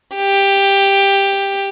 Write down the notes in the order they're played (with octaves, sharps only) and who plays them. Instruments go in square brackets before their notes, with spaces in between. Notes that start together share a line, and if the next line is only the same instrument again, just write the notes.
[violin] G4